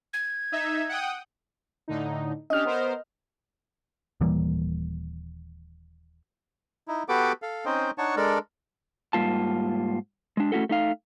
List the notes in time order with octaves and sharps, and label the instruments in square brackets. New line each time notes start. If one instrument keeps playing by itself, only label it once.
[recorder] G#6
[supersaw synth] D#4 E5
F#5 G5 D#6
[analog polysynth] A2 D3 D#4
[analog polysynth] C#4 D4 G4 [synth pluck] D#5 F6
[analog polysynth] B3 A#4 C5
[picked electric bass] D#1 E3 G3 A#3
[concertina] D#4 E4
B3 F#4 G4 A4 B4 D6
A4 F5
C4 C#4 D#4 C5 D#5 G5
D4 D#4 C#5 F#5 A5 C#6
G#3 D4 A4 A#4 D5
[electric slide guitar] G#2 G3 A#3 F4 A5
G#3 D4
A3 C#4 E4 F#4 A4
A3 D#4 F5